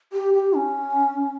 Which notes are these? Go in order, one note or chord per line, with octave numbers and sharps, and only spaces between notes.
G4
G4
C#4